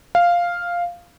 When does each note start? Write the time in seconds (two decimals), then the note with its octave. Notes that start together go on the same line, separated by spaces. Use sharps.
0.15 F5